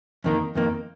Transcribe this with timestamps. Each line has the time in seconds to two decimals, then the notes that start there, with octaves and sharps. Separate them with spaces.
0.24 F2 D#3 A#3
0.55 F2 D#3 A#3